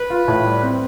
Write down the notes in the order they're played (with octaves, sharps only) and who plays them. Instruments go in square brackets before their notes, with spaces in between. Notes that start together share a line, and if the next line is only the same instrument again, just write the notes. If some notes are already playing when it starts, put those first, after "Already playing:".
Already playing: [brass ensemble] B4
[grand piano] F4
A2
G3
C4